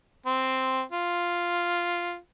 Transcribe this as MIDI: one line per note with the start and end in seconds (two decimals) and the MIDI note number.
0.26 0.82 60
0.92 2.16 65